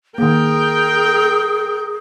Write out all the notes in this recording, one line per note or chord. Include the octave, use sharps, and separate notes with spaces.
D#3 A#3 G#4 A#4 G5